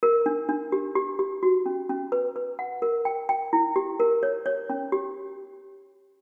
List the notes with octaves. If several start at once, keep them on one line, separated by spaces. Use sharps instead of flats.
A#4
D4
D4
G4
G4
G4
F#4
C#4
C#4
B4
B4
F#5
A#4
G5
G5
E4
G4
A#4
C#5
C#5
C#4
G4